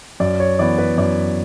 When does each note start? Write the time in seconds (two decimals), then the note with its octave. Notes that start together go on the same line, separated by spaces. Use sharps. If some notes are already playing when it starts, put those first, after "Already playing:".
0.20 F#2 D5
0.40 C#5
0.59 E3 B3 D5
0.78 B4
0.98 F#2 D5